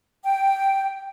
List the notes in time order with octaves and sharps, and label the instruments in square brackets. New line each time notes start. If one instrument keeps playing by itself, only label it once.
[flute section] G5